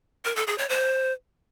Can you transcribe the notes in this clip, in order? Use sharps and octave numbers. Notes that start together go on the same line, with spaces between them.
A#4
A4
G#4
C#5
C5